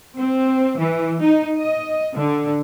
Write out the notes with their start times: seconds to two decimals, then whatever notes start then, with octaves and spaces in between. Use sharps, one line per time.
0.18 C4
0.77 E3
1.21 D#4
1.59 D#5
2.14 D3